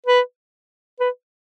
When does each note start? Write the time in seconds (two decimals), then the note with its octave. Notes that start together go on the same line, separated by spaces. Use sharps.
0.06 B4
1.00 B4